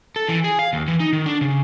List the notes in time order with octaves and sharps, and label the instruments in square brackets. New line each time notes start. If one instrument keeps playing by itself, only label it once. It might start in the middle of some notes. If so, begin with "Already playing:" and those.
[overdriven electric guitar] A4
E3
G#4
F5
D#2
E3
D#4
D#3
D4
C#3